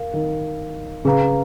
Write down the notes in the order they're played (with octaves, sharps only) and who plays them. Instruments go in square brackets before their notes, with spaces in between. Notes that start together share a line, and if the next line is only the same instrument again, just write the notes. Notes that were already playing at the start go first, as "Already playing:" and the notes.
Already playing: [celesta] A#4 F5
[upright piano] D#3
[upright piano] C#3 [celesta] G#4 B4 F5 A#5